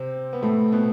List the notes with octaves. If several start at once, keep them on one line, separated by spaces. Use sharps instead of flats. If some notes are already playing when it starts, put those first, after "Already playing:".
Already playing: C3 C4
B3
A2 A3
B2 B3